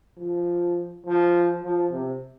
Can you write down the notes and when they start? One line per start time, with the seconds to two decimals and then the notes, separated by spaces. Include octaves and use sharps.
0.18 F3
1.06 F3
1.63 F3
1.92 C3